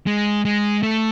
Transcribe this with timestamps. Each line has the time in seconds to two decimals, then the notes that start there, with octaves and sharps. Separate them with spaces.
0.06 G#3
0.45 G#3
0.83 A3